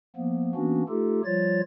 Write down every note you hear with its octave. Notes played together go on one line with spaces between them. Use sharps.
F3 A#3 B3
E3 A#3 B3 C#4 D4 F#4
A3 D#4 F4 G4 A4
F3 G3 F4 C#5 A6